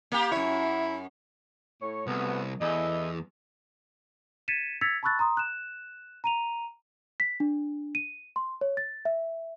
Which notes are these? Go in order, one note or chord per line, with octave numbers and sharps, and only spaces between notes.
A#3 G4
F#2 E4 C#5
A2 C#5
C2 B2 A3 B3
E2 E4 A4 D#5
G#6 A6 B6 C#7 D#7 E7
E6 G#6 A6 B6 C#7 F7
A5 B5 C#6 E6 F#6 A6
A#5 C6 D#6
F#6 E7
A#5 D#7 F7
B6
D4
D#7
C6
C#5
A6
E5